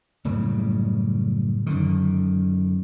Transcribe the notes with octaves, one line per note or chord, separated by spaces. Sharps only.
F#1 A2 C#3 G3
F#2 D3 D#3